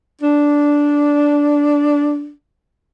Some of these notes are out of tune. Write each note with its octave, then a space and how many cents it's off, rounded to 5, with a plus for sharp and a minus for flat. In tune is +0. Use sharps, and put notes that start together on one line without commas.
D4 -10